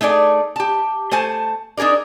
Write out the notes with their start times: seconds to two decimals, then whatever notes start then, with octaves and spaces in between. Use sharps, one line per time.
0.01 A3 D#4 G#4 D5
0.56 G4 A5
1.11 A3 C5 G#5 A5
1.77 D4 D#4 G#4 A#4 D5